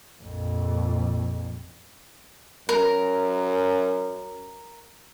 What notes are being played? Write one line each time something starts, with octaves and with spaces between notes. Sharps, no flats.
A#1 F2
F#2 A#4